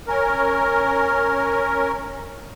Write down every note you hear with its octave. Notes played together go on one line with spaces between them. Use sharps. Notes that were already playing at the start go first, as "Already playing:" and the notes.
C#4 A#4